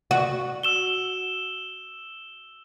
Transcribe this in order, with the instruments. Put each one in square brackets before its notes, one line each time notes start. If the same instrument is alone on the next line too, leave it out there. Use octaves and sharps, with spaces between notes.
[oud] F#4
[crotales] E6 E7 G7